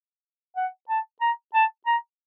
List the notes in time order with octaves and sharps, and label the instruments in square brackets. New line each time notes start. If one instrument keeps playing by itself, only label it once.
[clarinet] F#5
A5
A#5
A5
A#5